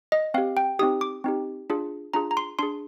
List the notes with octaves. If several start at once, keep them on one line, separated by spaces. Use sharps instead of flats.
D#5
C4 G4 F5
G5
C4 D#4 G4 D#6
D6
C4 D#4 G4
D4 F4 G#4
D4 F4 G#4 A#5
A#5
C6
D4 G#4 C6